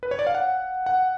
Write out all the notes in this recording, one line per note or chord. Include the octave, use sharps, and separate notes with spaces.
B4
C#5
D5
F5
F#5
F#5